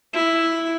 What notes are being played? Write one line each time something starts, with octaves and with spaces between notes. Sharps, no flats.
E4